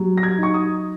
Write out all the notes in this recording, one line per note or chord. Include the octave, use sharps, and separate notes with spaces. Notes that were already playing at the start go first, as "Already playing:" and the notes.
Already playing: F#3
A#6
G#6
D#4 C#6
D#6